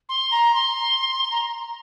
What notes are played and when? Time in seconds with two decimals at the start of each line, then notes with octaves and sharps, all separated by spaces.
0.09 C6
0.31 A#5
0.54 C6
1.30 A#5